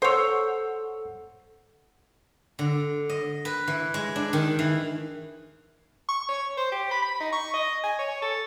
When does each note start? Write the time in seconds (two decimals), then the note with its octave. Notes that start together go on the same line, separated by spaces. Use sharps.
0.02 A4 C5 C#5 F#5 E6
2.59 D3
3.09 D#5
3.45 B4
3.67 E3
3.94 G#3
4.16 D4
4.33 D#3
4.59 E3
6.09 C#6
6.29 C#5
6.57 C5
6.72 G4
6.91 B5
7.02 B5
7.20 D#4
7.32 C#6
7.54 D#5
7.84 G#5
7.99 C#5
8.22 A4